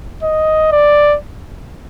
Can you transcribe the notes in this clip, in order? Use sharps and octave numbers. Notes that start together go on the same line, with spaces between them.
D#5
D5